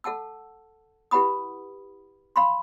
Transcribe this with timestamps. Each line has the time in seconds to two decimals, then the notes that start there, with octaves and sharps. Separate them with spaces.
0.04 A4 F#5 A5 E6
1.11 E4 G4 B4 F#5 B5 D#6
2.36 F5 B5 C6